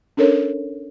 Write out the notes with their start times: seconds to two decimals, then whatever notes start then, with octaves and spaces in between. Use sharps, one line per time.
0.17 C#4 D4 A4 A#4 C#5